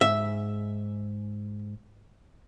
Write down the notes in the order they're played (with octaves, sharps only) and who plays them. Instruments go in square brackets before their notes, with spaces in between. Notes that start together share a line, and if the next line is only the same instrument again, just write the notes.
[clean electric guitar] G#2 [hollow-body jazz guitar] E5